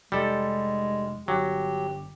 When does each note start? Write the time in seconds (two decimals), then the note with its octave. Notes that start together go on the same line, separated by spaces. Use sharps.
0.12 F1 G3 G#3 A4
1.28 G1 F#3 G4